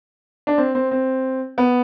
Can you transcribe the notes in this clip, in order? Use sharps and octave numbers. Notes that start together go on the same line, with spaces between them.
D4
C4
C4
C4
B3